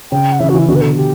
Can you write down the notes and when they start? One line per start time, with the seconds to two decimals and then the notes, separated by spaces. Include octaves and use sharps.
0.12 C#3 G5
0.32 F#5
0.40 C#3 E3 E5
0.49 F#4
0.54 C#3 E3 E4
0.68 B2 D3 F#4
0.75 B4
0.82 A4
0.96 G4